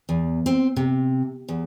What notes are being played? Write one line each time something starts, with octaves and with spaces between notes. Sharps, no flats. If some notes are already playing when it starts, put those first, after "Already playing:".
E2
C4
C3
E2